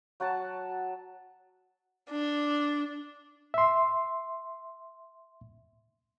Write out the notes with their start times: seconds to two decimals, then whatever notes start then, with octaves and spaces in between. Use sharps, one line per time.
0.20 F#3 F#4 F#5 A5
2.09 D4
3.54 E5 C6